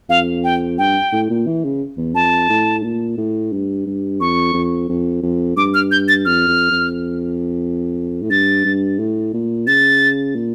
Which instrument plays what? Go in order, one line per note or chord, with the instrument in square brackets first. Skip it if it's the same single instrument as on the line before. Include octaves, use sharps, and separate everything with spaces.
[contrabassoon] F2 [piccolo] F5
[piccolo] G5
[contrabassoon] G2 [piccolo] G5
[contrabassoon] A2
A#2
E3
C#3
E2
[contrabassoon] F2 [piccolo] A5
[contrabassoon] A2
A#2
A2
G2
G2
[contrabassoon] F2 [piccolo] C#6
[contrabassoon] F2
F2
F2
[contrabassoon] G2 [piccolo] D6
[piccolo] F6
G6
A6
[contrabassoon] F2 [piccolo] F6
[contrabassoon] F2
F2
A2
[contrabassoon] G2 [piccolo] A6
[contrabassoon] G2
A2
A#2
[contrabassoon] C#3 [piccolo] A6
[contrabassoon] A#2